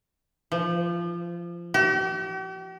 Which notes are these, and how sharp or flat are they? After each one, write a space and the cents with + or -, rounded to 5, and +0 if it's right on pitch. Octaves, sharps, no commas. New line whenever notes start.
F3 -20
G4 -45